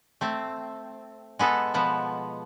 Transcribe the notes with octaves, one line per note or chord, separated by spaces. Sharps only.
A3 C4
G#3 B3 A4
B2 F3 B3